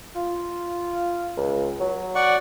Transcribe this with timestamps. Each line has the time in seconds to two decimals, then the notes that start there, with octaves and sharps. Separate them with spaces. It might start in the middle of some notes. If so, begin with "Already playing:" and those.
0.15 F4
1.37 C#2
1.80 F#3
2.15 D5 F#5 C#6